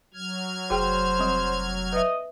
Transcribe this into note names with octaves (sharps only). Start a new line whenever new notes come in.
F#3 F6 G#6
F1 F#4 G#4 C5 G5
G3 C4
B4 D#5 E5